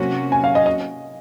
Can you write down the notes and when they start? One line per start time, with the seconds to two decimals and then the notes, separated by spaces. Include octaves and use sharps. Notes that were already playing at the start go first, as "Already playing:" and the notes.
Already playing: C3 F#3 A#3 C#4 F#4
0.32 G#5
0.44 F5
0.55 D#5
0.66 D#5